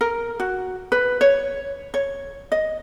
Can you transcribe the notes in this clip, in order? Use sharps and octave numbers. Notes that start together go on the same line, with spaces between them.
A#4
F#4
B4
C#5
C#5
D#5